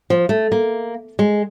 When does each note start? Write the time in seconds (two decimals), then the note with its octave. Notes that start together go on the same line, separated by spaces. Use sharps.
0.10 F3
0.29 A3
0.52 A#3
1.19 G#3